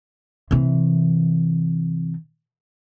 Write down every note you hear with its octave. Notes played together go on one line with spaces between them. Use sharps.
C3 E3